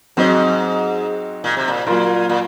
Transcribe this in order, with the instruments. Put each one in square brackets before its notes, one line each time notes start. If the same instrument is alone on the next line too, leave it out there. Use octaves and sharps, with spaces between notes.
[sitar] G#2 [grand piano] F#3 C4 D#4
[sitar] A#2
C3
A#2
[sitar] A#2 [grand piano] F#3 A#3 F4 A#4
[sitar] A#2